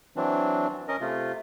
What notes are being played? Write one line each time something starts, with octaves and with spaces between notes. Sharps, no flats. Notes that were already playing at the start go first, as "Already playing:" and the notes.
E3 F#3 C4 D4
C#4 A#4 D#5
C3 A3 F4